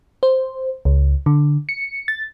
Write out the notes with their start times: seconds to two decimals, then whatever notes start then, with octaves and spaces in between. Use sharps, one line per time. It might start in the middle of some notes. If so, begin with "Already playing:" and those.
0.23 C5
0.85 C#2
1.26 D3
1.69 C#7
2.08 A6